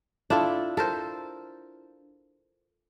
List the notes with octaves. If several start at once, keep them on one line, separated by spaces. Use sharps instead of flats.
D4 E4 F4 A4
A4 A#4 C5